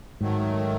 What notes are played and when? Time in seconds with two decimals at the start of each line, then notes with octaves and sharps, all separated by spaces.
0.20 G#2 D#3 F#3 A3